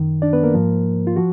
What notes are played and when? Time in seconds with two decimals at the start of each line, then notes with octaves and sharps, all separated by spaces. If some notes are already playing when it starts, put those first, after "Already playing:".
Already playing: F#2 D#3
0.22 D4 D5
0.33 B3 B4
0.44 A#3 A#4
0.54 G#2 F3
1.07 F4
1.16 F3 F#4